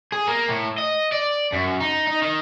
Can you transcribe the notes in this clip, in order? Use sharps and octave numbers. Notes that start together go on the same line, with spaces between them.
G#4
A#3
A2
D#5
D5
F#2
D#4
D#4
D#3